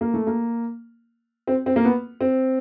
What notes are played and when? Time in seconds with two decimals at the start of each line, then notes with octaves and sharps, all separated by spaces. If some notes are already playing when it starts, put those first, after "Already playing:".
0.01 A#3
0.14 A3
0.27 A#3
1.47 C4
1.66 C4
1.76 A#3
1.85 B3
2.21 C4